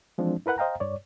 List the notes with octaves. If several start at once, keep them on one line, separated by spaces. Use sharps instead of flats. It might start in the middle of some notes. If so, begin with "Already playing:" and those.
E3 F3 G#3 C4 D4
E4 A#4 B4 F#5 F#6
C5 D#5 F5 G5 A#5
G2 C#5 D5